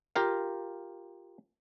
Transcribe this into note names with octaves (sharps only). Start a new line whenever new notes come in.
F4 G4 A#4 F5